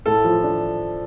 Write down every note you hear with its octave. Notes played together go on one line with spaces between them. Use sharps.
A2 A4
F3
D4